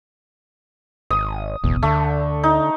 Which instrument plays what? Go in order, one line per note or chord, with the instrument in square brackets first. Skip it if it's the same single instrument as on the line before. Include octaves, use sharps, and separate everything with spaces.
[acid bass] G#1 [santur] D#6
[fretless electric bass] D1 G#1 B2 [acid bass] E2
[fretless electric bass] D2 [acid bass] D3 [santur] A3
[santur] D#4